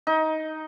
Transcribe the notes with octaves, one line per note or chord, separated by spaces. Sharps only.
D#4